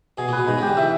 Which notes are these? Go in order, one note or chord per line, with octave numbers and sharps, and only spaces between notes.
B2 G#4
A#2
B4
B2
G#2 D#4
C#3
D3 G4
E3 E5